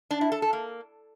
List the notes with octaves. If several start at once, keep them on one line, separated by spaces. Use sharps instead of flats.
D4
E4
A4
A4
A#3